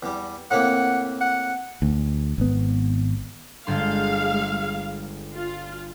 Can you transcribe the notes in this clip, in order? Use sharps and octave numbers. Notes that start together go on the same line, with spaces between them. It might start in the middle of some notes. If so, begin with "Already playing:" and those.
E2 G3
A2 C3 A#3 F#5
F#5
D2
G#1 B3
G1 G#3 A4 F5 C6
F4